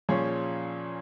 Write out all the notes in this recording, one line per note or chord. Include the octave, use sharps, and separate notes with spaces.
A#2 F3 C#4 G#4 C#5